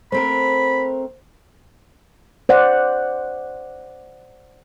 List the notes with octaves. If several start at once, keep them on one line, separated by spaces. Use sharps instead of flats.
A3 C4 A#4 C5 B5
C5 D5 F#5